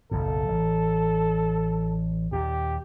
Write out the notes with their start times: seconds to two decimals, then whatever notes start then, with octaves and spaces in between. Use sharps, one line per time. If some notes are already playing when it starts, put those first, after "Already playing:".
0.11 F#1 B1 A2 A4
0.48 A1
2.32 D#2 A#2 G4